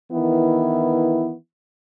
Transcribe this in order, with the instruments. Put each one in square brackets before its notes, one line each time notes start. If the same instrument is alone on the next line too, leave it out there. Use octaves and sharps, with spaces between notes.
[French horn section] D#3 E3 B3 E4